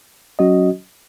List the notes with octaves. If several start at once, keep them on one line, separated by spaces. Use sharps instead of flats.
F#3 C#4 F#4 D#5